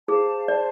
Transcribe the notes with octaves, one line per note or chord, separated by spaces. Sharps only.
G#4 C5 F5 A5
C5 D5 F5 A5